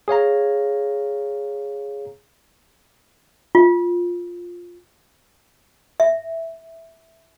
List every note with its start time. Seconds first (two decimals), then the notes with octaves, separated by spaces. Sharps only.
0.08 G#4 C#5 F5 A#5
3.55 F4
6.00 E5